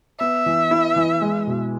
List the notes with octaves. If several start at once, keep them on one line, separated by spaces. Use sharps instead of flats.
B3 E5
E3
E4
E3
G#3
B2